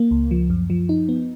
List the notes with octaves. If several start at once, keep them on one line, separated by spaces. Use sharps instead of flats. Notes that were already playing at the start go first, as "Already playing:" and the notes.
Already playing: A#3
C#2
F3
F#2
F3
D#4
B3